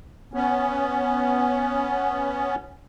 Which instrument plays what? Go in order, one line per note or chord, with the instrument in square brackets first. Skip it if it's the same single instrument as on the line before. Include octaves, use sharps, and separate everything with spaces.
[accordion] B3 C#4